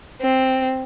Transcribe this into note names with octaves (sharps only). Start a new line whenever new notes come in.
C4